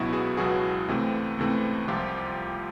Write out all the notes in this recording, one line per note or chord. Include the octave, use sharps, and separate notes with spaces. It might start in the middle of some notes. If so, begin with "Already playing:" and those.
Already playing: C#2 B2 F#3 B3 E4 F#4
F#4 G#4
C#2 B2 F#3 B3 F#4 G#4
C#2 C3 E3 A3 C4
C#2 C3 E3 A3 C4
C2 C3 F3 F4 G4